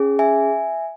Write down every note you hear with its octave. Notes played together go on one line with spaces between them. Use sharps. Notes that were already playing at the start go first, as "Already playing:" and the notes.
Already playing: C#4 G#4
E5 G#5